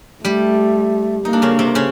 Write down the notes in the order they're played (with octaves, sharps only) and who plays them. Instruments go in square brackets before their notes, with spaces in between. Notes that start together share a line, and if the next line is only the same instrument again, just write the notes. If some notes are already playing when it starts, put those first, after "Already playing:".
[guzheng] G3 G4 [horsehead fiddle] A3
[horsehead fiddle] A#3 [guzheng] D#4
[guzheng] D4
C#3 C#4
C3 C4
C#3 C#4